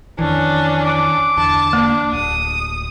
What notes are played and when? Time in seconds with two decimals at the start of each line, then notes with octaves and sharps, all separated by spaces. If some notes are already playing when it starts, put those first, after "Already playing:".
0.19 F2 D#3 E3 C#4 D4
0.85 D6
1.37 E2 D3 A5
1.73 A#3 D4
2.13 D1 D#6